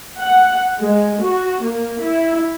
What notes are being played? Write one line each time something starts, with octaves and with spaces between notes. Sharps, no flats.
F#5
G#3
F#4
A#3
E4